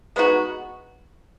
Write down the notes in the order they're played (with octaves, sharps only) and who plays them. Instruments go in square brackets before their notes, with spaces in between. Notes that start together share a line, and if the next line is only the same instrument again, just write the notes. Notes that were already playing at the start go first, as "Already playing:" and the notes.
[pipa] G#3 B3 D#4 F#4